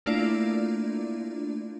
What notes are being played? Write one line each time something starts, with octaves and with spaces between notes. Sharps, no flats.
A3 A#3 D4 E4 F4 D5